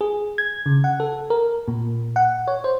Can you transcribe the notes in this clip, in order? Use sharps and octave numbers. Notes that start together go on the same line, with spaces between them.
G#4
G#6
C#3
F#5
A4
A#4
A#2
F#5
C#5
C5